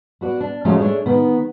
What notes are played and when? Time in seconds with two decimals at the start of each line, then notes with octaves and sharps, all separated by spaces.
0.21 B3 F#4 D5
0.41 D4
0.65 F3 G#3 A3 C#4 F#4 A#4
0.79 A3 D4 E4 G#4 C#5
1.06 D#3 B3